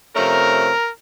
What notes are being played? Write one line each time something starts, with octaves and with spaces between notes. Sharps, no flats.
C3 F3 A3 C#4 A#4